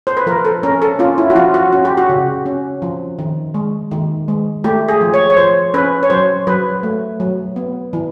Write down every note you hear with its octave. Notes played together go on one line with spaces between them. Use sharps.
C5
B4
F3 A#4
A4
C#4 A#4
A4
C#4 F4
E4
F#4
F3 F4
F#4
C#4 F#4
G4
F#4
C#3
C#4
F3
D#3
G#3
D#3
G#3
A3 G4
G#4
F3
C#5
C#5
F3 C5
C#4 B4
C#5
F#3 C5
F#3 B4
A3
F#3
B3
E3